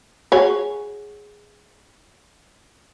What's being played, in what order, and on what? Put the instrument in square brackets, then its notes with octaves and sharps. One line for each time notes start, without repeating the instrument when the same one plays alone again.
[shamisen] F#4 G#4 C#5